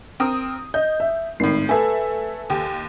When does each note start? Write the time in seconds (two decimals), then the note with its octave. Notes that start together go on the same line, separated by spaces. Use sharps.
0.20 C4 A#4 D#6
0.74 D#5 G6
1.00 E5
1.40 G#1 A2 D#3 C7
1.69 A3 A4 B4 E5 G#5
2.50 D#2 G4